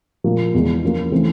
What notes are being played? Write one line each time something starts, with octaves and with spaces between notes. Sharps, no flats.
A#2 F3 A#3
E2 B2 G#3
F3 A#3 C#4 F4
E3 A3 C4